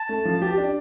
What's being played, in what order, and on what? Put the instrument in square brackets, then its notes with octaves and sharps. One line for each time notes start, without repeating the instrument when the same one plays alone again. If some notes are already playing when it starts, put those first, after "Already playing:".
Already playing: [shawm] A5
[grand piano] A3
F3
G4
D4